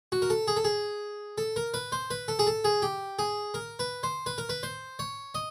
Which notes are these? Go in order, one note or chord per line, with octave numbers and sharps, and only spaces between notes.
F#4
A#4
A4
G#4
A4
G#4
A4
A#4
B4
C5
B4
A4
G#4
A4
G#4
G4
G#4
A#4
B4
C5
B4
A#4
B4
C5
C#5
D#5